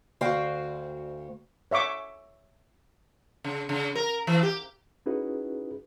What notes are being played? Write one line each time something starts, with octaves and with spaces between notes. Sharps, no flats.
D2 F#4 C5 F5 G5
C#5 E5 C#6 D6
C#3
C#3
A#4
E3
G4
C#4 D#4 E4 F#4 G#4 B4